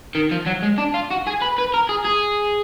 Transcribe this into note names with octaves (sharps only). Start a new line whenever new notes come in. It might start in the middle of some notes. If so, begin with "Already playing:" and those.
D#3
F3
F#3
G#3
D4
F4
F#4
G#4
B4
B4
A#4
G#4
G#4